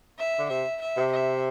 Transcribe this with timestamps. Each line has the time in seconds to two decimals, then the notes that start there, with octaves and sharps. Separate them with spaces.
0.19 E5
0.39 D3
0.49 C3 E5
0.81 E5
0.97 C3
1.12 E5